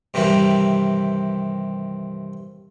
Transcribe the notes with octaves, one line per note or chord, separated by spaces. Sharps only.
G2 C3 D#3 E3 G3